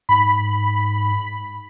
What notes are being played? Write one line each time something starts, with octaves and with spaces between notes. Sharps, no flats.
G#2 B5